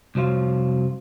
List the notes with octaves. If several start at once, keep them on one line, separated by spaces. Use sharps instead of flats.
C2 F2 F3 F#3 F4